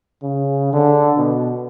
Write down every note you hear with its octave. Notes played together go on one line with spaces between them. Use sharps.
C#3
D3
B2